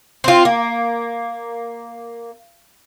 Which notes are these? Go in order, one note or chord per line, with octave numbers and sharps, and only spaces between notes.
C4 F4
A#3